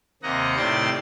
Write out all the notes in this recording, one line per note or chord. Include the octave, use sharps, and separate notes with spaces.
D#2 C3 A#3 D#5 F#5 A#5
A2 C3 D#3 D5 C6 A6